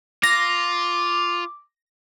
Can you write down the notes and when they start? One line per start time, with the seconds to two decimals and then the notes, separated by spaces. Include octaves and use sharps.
0.23 F4 D6 A#6